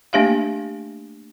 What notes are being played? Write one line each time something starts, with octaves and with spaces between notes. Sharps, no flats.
A3 A#3 D4 G4 E5 F5